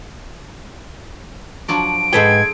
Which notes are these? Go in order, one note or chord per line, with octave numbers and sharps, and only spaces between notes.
F3 F#3 D4 D7
G#2 G#4 A4 B4 C5 G5 G#6